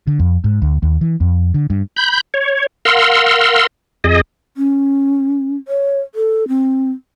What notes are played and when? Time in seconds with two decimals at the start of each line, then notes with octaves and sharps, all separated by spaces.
0.07 D3
0.19 F2
0.44 G#2
0.62 D2
0.82 D#2
1.01 E3
1.20 F2
1.54 D3
1.70 G2
1.96 B5 G6
2.34 C#5
2.85 A#4 F5 F#5 C6 E6
4.04 F2 G#4 D#5
4.57 C#4
5.68 C#5
6.15 A4
6.48 C4